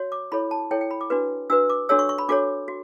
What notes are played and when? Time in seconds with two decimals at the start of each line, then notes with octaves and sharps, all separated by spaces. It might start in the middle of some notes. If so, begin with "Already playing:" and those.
Already playing: F#4 C#5
0.12 D6
0.32 E4 A4 C#5 B5
0.51 A5
0.71 E4 A4 C#5 G5
0.81 G5
0.91 B5
1.01 D6
1.10 D4 F#4 B4
1.50 D4 F#4 B4 E6
1.69 D6
1.89 D4 F#4 A4 C#5 E6
1.99 C#6
2.09 C#6
2.18 B5
2.29 D4 F#4 A4 C#5 D6
2.68 F#4